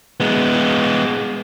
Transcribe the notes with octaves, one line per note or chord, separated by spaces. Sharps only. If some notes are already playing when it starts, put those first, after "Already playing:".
G#3 B3